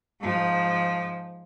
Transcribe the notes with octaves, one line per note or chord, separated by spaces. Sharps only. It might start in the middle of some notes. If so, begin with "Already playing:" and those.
G#2 F3